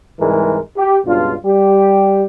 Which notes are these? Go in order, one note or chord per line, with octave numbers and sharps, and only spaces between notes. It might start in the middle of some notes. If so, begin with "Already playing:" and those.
C2 G#2 E3 G3 G#3 A#4
G4
C#2 G2 B2 D4 F4
G3 G4